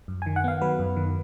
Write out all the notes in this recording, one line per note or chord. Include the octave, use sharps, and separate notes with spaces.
F#2
D#3 G#5
F#5
B3 F5
F#3 B4
F#2
D#3